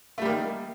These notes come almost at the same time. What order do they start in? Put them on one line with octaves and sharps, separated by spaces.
A3 G3 A#3 D#3